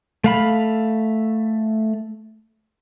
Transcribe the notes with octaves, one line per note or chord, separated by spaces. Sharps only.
A3 F5 B5